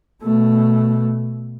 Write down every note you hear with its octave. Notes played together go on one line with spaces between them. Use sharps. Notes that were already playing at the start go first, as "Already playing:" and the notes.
B2 A3